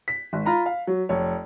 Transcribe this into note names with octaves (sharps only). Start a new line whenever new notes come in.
B6
G#1
F4 A#5 B5
F5
F#3
F1 C#5